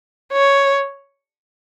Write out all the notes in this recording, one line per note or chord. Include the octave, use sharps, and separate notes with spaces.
C#5